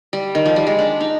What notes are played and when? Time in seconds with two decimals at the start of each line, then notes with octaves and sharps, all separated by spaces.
0.13 G3
0.35 D#3
0.46 F3
0.56 G3
0.67 G#3
0.79 D4
1.00 D#4